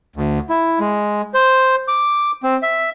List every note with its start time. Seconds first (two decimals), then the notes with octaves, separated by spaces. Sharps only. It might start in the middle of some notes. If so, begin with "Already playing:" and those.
0.16 D2
0.49 E4
0.80 G#3
1.34 C5
1.88 D6
2.43 C4
2.63 E5